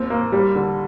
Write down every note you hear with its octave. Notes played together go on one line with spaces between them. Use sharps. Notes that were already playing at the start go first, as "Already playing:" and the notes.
Already playing: D#2 C4
A#3
G3
D3